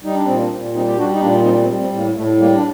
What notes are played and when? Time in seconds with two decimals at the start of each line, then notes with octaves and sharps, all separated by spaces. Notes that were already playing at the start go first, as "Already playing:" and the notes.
0.04 G3 D#4
0.15 D4
0.25 A#2 C4
0.36 A#3 D4
0.51 A#2
0.74 G3 C4 D#4
0.87 G4
0.98 G3 D4 F#4
1.13 D#4
1.21 A#2 A#3 D4
1.44 G3 C4 D#4
1.62 A3 C4
1.68 G3
1.79 A3 C4
1.92 A2 A#3
2.15 A2 A3
2.38 G3 A#3
2.54 D4